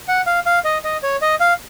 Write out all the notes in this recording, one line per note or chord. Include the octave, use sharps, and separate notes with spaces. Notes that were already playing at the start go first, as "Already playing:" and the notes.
F#5
F5
F5
D#5
D#5
C#5
D#5
F5